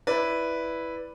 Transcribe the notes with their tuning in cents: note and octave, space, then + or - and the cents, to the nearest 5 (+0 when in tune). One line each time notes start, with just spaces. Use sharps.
E4 +0 B4 +0 D5 +0